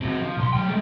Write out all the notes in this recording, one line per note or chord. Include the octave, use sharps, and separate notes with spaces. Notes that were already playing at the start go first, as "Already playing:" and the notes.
C4 F#4
F3
B1 C6
F#3 G5
G#3 A3